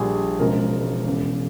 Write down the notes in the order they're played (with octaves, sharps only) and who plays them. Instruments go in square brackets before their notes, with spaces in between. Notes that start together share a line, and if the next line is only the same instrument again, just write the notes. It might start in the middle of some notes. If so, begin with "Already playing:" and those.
Already playing: [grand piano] A#1 A#2 G3 G#4
E1 E2 C#3 F3 G#3 A#4
E1 E2 C#3